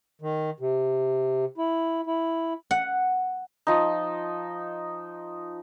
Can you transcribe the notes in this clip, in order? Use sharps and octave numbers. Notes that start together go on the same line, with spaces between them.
D#3
C3
E4
E4
F#5
F3 D#4